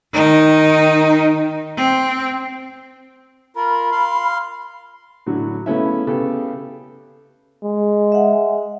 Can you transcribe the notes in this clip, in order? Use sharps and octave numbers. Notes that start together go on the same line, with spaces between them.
D#3 D#4
C4
F4 A#4 B5
F5 C6
A2 D3 F#3 F#4
C#3 A3 B3 C#4 E4 E5
C#3 B3 G4 A4
G#3
E5 F#5